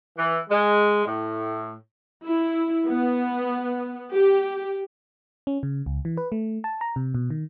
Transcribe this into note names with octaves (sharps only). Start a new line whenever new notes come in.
E3
G#3
A2
E4
B3
G4
C#4
C#3
C#2
E3
B4
A3
A5
A#5
C3
B2
D#3